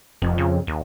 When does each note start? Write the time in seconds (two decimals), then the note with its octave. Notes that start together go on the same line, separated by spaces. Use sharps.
0.22 F1 F2
0.38 C#3
0.67 D#2